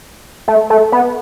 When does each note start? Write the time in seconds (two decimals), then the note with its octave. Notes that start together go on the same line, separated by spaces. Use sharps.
0.48 A3
0.70 A3
0.92 B3